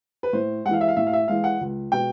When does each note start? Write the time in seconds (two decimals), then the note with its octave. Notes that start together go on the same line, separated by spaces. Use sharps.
0.23 B4
0.33 A2 C5
0.65 G#3 F#5
0.69 E3 F5
0.81 E5
0.88 F5
0.96 A2 E5
1.07 F5
1.13 E5
1.28 E3 G#3 F5
1.44 F#5
1.61 C#2
1.92 B2 G#3 G5